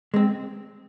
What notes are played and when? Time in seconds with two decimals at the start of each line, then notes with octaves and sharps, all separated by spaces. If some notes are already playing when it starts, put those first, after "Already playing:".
0.14 G#3 C4